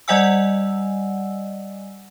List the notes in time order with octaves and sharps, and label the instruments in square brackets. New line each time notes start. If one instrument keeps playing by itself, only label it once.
[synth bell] G3 D5 D#5 F#5 G#5 E6